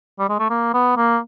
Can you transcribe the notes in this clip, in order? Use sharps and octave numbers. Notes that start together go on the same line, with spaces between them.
G3
G#3
A3
A#3
B3
A#3